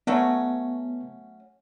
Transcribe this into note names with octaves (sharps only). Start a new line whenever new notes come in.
F#3 A3 B3 C#4